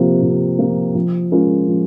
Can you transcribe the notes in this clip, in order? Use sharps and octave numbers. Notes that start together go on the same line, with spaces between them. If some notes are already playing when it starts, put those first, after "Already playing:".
Already playing: C3 F3 A#3
C3
F3 A#3
F3
G#3 C#4 F4 A#4
F3